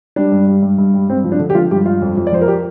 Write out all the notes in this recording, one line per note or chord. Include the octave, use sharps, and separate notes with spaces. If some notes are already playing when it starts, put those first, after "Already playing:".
G3 D4
G2
G3
G2
G2
G3
G2 C4
F3
D4
D3
G4
F3 F4
G2 G4
G2 F4
F2
F2
D5
F3 C5
A#4
G4